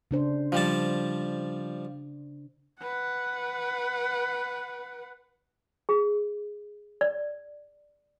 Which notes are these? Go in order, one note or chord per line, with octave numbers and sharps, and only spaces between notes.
C#3 D4 C5
F3 G3 A5
B4 F#5
G#4
D5